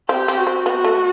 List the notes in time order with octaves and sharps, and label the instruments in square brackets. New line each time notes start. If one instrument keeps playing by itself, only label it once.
[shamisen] C4 [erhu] G4
[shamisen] C4
[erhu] F#4
[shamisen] C4
[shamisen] B3 [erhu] F#4
[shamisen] A3